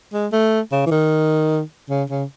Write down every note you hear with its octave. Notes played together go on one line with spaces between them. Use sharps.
G#3
A3
C#3
E3
D#3
C#3
C#3